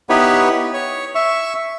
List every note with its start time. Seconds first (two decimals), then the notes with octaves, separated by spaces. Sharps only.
0.09 B3 D#4 E4 G4 B4 C#5
0.74 C#5
1.15 E5 C#6